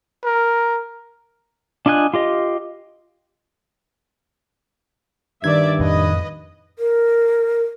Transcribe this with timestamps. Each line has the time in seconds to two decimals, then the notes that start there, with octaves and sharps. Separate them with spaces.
0.24 A#4
1.86 D4 F4 D#5 G#5 F#6
2.14 F4 G4 D#5
5.44 G2 D#3 D#4 D5 E5 G#6
5.79 F2 A2 B4 D#5
6.79 A#4